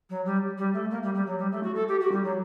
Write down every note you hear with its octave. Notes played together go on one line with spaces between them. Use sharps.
F#3
G3
G3
A3
A#3
G3
G3
F#3
G3
A3
F#4
A4
G4
F#4
G3
F#3